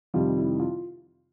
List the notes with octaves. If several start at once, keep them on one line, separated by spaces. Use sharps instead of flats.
F2 C3 D#3 G3 F4
E4
F4